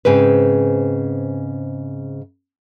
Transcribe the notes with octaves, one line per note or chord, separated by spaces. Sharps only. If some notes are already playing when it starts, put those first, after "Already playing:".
G#2 C#3 C4 B4